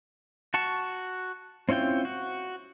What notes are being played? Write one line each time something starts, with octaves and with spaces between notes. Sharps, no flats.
F#4 A5 C#6
C4 C#4 E4 F4 G5
F#4